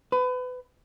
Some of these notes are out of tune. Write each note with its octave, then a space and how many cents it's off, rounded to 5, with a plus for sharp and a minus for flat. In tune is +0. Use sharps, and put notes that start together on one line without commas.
B4 +30